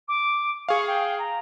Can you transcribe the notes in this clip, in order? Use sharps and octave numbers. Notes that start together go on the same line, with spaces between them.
D6
G#4 F5 C#6
G5
A#5